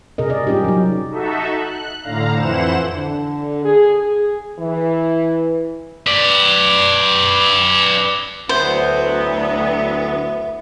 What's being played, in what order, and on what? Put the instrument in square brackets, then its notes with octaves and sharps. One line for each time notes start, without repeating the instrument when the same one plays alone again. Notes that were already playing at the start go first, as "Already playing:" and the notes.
[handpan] C3 G#4 A#4 D#5
D5 D#5
G3 C#4 D#4 F4 G4
F#3 D#4
[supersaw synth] D#4 F#4 A4 E5
F#6
A2 D3 F5 A#5
F2 E3 E4 C5 F#5 E7
[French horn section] D3
G#4
G#4
E3
[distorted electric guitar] B4 D5
[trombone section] D2 [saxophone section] F#3 B3 [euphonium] E4 [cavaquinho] C5